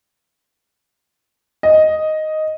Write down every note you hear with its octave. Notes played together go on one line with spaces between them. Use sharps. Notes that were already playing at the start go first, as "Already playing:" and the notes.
D#5